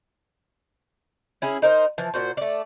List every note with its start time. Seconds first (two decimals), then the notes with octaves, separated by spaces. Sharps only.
1.42 C#4 E4 G#4
1.62 D#4 A#4 C5
1.98 E3 F3
2.14 A#2 F#4 C5
2.37 A3 D5